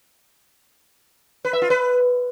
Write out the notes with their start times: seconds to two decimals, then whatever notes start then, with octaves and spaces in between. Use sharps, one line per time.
1.45 B4
1.53 E5
1.62 F4
1.70 B4